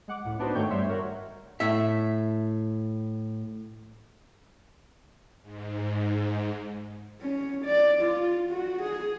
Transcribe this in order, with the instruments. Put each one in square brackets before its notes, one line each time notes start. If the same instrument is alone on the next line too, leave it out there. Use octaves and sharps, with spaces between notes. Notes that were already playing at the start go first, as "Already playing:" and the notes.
[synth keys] G#3 F#5 D6
C#2 A2
B3 D4 D#4 F#4 C5
G#2 D#3 A3 C#5 G5 G6
G2 G3 C5 C#5 E5 C6
F#4 A#4 C#5 F#5
[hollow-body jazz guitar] A2 E5
[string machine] G#2
[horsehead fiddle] C#4
D5
F4
F#4
G#4